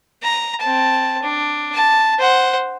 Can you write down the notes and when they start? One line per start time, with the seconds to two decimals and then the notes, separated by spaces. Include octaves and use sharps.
0.23 A#5
0.60 C4 A5
1.22 D4
1.75 A5
2.19 C5 F#5